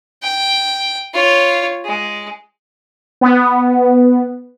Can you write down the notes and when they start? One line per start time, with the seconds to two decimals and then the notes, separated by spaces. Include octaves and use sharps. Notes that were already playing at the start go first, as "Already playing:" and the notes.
0.23 G5
1.14 F4 C#5
1.85 G#3
3.21 B3